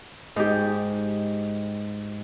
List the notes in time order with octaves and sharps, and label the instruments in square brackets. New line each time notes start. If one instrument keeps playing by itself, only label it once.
[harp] G#2 G4